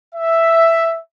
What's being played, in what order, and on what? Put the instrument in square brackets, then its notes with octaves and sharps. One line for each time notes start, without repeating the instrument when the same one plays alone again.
[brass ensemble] E5